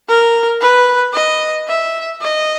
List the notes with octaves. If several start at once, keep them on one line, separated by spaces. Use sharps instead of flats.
A#4
B4
D#5
E5
D#5